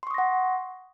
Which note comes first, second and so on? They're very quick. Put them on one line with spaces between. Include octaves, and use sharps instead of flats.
C6 C#6 D#6 A#6 F#5